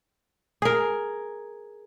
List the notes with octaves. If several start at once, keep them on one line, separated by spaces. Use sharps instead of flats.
G#4 A#4